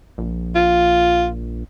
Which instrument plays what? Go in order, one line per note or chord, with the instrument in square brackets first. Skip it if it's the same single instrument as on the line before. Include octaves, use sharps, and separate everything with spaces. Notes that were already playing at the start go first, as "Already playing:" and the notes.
[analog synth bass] A#1
[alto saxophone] F4